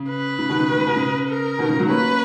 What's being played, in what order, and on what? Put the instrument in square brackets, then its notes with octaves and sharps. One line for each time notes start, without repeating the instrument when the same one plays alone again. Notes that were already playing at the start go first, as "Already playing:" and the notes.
Already playing: [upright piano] C#3
[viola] B4
[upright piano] C#3
B2 D#3
C#3
D#3
C#3
B2
C#3
[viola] A#4
[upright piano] B2 D#3
C#3 F3
D#3 F#3
[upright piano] A#3 C#4 [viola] B4